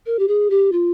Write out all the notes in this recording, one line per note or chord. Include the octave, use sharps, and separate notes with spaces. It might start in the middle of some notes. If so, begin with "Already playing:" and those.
A#4
G4
G#4
G4
F4